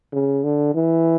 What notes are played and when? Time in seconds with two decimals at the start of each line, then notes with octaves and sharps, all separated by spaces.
0.13 C#3
0.44 D3
0.75 E3